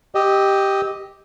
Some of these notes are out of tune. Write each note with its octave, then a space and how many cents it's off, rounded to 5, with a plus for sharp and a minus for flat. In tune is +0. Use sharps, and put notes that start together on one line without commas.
G4 +0 D#5 +0 E6 -35